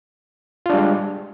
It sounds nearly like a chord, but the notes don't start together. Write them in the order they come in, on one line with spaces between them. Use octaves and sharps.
F4 D4 G3 G#3